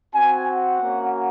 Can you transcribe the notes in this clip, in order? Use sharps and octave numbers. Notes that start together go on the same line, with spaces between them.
C4 F#4 G#5
F#5
A#3 C#4 F#4